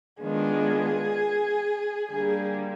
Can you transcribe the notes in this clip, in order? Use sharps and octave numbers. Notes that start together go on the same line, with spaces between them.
D#3 G#3 B3 D4 F4 G#4
D3 G3 A#3 G#4